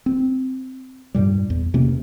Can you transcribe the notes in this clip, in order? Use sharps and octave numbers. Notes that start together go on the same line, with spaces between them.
C4
G2 A#2 G3
E2
C3 A#3 C#4